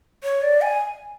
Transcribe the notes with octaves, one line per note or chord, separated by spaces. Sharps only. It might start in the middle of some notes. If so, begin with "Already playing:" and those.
C#5
D5
G#5